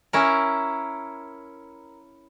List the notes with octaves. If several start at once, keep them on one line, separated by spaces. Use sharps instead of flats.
C#4 E4 A#4